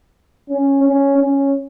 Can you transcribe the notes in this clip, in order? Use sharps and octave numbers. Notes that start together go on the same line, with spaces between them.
C#4
C#4
C#4